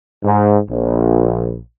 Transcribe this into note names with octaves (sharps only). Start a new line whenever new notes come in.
G#2
A#1